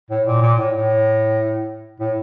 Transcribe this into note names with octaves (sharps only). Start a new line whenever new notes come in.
A2
A#2
A#2
A2
A2
A2